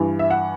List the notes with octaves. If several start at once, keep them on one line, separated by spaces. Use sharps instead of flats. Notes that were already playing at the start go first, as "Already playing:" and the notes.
Already playing: G2 E3
E5
F#5